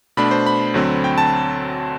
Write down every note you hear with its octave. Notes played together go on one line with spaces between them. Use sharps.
B2 A3 D4 B5
C5
B5
D2 D3 F#3 C4
G5
A5